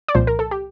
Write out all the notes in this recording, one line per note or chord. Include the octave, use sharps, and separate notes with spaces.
D5
C2 A#2 F3 C5
A#4
A4
G4